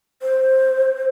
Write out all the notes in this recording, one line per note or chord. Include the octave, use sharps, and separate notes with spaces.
C5